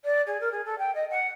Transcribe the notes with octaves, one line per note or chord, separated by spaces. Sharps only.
D5
G#4
A#4
G#4
A4
G5
D#5
F#5